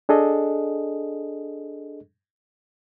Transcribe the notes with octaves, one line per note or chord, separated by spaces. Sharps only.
D4 G#4 A4 D#5